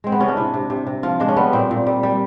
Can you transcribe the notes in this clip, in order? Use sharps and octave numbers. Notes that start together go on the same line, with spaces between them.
G#3 C4
B3
C3 C#4
D4
C3 E4
C3
C3
C3
F3 F4
G#3 D4
C#4
G3 B3
A#2 C4
A#2
G3
G3